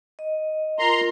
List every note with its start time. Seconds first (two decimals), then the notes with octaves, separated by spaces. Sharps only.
0.19 D#5
0.79 F4 A#4 A#5 C6